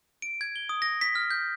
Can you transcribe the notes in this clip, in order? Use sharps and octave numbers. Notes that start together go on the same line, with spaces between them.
D7
G#6
G7
D#6
A#6
B6
F6
G6